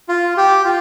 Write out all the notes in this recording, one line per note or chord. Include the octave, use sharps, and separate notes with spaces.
F4
G4
F4